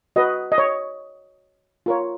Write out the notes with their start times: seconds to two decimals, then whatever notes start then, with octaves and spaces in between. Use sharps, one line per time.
0.16 F#4 B4 D#5
0.52 D#5
0.58 C#5
1.86 F4 A#4 C#5